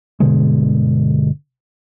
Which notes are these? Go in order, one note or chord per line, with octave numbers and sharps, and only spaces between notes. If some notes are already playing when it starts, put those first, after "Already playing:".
G1 B2 D3 G#3